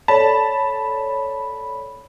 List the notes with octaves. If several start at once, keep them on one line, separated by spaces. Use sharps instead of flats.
A4 C#5 D5 A5 B5